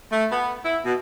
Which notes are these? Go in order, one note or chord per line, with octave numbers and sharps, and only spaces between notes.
A3
B3
E4
B2